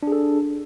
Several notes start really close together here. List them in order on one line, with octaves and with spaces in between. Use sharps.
D4 G#4 A4